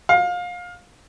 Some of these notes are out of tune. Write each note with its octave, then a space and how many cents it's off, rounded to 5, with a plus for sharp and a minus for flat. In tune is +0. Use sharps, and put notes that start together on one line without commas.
F5 +25